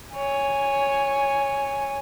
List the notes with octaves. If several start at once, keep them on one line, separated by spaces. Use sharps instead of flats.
C#5 G#5